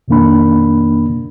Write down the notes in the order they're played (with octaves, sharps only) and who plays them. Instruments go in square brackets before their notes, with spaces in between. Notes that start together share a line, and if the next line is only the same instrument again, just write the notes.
[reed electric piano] F2 B2 D#3 A#3 D4 B5